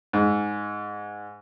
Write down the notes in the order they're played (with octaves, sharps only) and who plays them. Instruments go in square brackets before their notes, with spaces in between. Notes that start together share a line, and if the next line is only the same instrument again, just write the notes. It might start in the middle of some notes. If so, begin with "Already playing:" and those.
[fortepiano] G#2